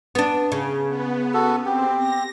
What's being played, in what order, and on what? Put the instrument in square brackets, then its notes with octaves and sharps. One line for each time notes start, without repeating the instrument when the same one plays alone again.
[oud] B3 D4
C#3
[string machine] B3
[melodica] F#4 A4
[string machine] C4 [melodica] G4
[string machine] A#6